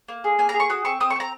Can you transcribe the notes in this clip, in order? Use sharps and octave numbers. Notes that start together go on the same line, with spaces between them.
A#3
G#4
A#3 G#5
A#5
G#4
C#6
F#4 D#6
C4 C#6
C4 D#6
C#6
C4 A#5